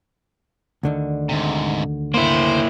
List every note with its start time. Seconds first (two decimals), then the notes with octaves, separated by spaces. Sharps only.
0.83 D2 D3 D#3
1.29 G#2 C3
2.14 A#3 E4 C5